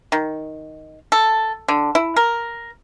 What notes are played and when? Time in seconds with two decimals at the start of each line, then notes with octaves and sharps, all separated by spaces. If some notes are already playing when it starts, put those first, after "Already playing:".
0.12 D#3
1.12 A4
1.68 D3
1.95 E4
2.16 A#4